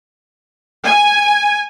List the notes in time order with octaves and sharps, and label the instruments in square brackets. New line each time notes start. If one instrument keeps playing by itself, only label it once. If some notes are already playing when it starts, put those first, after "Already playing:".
[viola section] G#5